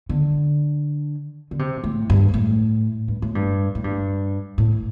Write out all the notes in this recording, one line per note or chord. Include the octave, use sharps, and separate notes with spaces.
D3
D3
C3
A2
G2
A2
G2
A2
G2
A2
G2
A2